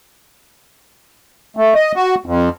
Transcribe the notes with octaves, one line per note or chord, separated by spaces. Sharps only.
A3
D#5
F#4
F2